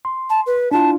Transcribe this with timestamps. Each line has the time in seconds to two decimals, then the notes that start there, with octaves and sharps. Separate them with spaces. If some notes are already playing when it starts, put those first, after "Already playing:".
0.05 C6
0.29 A5
0.46 B4
0.71 D4 E4 F4 A5